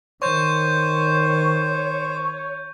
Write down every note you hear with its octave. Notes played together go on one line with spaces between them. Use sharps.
D#3 C5 C#5 C#6 G6